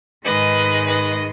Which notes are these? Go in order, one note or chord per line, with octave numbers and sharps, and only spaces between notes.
G#2 D#3 G#3 B4 D#5
B4 D#5